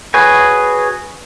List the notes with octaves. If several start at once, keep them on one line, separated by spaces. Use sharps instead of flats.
F#4 G#4 B4 C#5 G#5